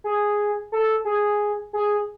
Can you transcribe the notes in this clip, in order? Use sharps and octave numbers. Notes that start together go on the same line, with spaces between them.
G#4
A4
G#4
G#4